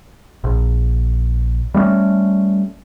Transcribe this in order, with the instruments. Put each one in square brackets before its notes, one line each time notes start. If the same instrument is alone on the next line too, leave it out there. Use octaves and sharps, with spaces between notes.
[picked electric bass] A#1
G3 A3 A#3 C#4